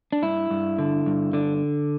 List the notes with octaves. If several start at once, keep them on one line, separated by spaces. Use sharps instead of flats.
D4
G2 E4
G2
D3
G2
D3 D4